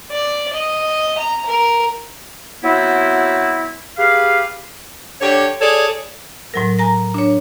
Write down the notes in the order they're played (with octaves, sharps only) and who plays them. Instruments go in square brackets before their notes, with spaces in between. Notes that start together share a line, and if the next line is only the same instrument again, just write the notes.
[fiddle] D5
D#5
A#5
A#4
[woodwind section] F#3 B3 C4 E4
G4 G#4 B4 F5
[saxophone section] D3 G4 C#5
G#4 A4 C#5 D5
[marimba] A2 F#3 A#4
G#5 A#5 A#6
D4 C#5